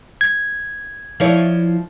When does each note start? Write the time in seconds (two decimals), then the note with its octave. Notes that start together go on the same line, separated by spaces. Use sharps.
0.21 G#6
1.20 F3 E4 C#5